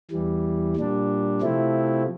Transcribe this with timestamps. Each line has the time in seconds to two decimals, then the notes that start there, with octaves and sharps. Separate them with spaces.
0.11 E2 E3 G3
0.76 A#2 G3 D4
1.42 C3 F3 A3 C4 E4